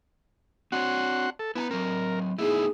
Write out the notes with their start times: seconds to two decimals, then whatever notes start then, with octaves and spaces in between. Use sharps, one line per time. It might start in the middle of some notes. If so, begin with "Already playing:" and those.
0.72 C4 D4 F#4 C#5 F#5 C6
1.39 A4
1.56 B3 E4 A5 A#5
1.71 F#3 C4 A#4
2.39 A3 B3 D#4 E4 G#4